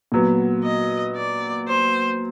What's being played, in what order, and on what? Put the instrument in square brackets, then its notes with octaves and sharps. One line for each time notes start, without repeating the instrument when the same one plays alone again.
[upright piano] A#2 F#3 B3
[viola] D#5
D5
C5